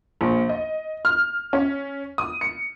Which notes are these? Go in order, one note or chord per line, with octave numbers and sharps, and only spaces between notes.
A#1
D#5
F6
C#4
D#6
C#7